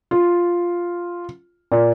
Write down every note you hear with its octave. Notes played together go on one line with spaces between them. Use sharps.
F4
A#2